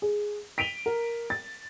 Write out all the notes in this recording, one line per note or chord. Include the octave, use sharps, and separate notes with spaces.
G#4
B6 D7 D#7 F7 G7
A#4
A6